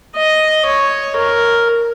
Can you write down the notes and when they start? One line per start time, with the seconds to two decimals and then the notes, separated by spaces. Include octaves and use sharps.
0.16 D#5
0.66 C#5
1.16 A#4